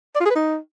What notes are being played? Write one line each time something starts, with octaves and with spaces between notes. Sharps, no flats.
D5
F4
G#4
B4
D#4